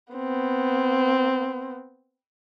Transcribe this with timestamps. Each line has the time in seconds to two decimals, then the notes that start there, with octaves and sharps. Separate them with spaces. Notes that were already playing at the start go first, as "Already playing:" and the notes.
0.14 B3 C4